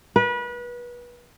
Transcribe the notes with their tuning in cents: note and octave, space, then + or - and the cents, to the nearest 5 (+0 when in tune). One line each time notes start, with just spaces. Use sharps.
B4 -30